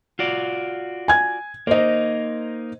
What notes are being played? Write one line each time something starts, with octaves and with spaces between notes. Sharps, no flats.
F4 F#4 D5
G#5 G#6
A#3 D#4 C5 D#5